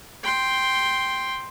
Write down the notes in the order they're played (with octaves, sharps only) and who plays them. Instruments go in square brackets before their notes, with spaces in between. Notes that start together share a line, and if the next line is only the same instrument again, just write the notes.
[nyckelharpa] G5 C6